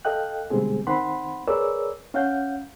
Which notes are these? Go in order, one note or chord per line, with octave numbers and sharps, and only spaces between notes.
A4 D#5 F5 G5 F#6
B2 D3 G3 G#3 C4 G#4
D#3 C4 F#5 B5 C6
G#4 A#4 B4 C#5 D5 E6
C#4 F5 F#5 G6